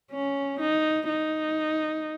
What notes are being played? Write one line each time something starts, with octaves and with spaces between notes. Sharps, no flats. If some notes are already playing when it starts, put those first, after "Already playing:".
C#4
D#4
D#4